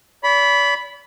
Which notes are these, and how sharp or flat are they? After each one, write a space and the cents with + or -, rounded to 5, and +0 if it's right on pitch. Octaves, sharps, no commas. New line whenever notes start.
D5 -45 B5 +0